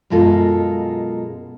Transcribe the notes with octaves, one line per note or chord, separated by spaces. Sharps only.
F#2 B2 G#3 F4 A4 A#4